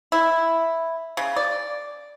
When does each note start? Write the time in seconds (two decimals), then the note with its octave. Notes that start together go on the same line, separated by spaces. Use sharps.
0.12 E4
1.17 C#3
1.36 D5